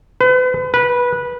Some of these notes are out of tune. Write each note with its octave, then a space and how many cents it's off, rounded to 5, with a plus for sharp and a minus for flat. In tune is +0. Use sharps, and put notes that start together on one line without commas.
B4 +40
B4 -15